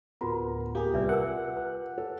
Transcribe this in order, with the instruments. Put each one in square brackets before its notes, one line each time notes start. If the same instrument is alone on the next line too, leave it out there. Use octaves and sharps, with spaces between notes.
[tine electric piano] D2 A2 B3 [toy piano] F4 F#4 A#5 [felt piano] A#4
[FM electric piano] A#3 G#4 [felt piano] G4
[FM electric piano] C2 [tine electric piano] F4 [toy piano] B4 D5 E5
[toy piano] A#4 G#5 E6 [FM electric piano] F#5
[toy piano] B4
[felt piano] A4